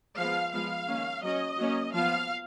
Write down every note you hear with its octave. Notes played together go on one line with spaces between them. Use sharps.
F3 G#3 B3 F5
F3 G#3 B3 F5
D#3 A#3 C#4
F#3 C#4 D#5
F#3 A#3 C#4
F3 F5
B3